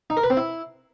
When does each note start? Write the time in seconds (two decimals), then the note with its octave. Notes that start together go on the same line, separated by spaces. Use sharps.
0.10 D#4
0.17 A#4
0.24 B4
0.30 C4
0.37 E4